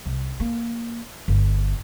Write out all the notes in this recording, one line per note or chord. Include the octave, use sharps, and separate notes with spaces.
C2
A#3
G1